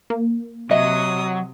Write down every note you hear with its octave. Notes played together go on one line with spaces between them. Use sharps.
A#3
C3 F#3 D#5 E5 D#6